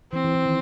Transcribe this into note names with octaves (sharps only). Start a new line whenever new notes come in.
E3 C4
E3
E3
D#3